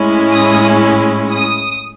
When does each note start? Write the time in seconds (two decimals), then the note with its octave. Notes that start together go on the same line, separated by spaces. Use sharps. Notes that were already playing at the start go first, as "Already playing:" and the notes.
Already playing: A2 G#3 C#4 E4
0.33 D#6
1.31 D#6